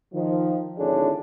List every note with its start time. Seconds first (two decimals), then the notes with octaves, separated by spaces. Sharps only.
0.13 D#3 F3
0.78 G#1 D3 D4 E4 G#4 C#5